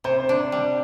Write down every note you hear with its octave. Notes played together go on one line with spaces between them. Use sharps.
C3 C5
C5
D4
G3